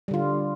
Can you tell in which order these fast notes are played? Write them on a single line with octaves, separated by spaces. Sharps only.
G3 D3 F4